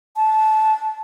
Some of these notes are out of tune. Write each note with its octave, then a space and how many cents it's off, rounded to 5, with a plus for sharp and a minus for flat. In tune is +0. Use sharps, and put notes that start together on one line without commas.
A5 -20